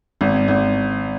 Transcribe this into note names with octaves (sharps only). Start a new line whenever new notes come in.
G#1
G#1